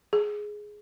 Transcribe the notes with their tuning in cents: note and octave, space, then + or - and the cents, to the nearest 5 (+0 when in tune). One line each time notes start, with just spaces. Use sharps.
G#4 +5